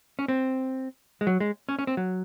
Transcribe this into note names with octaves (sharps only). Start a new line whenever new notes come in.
C#4
C4
G#3
F#3
G#3
C#4
C#4
C4
F#3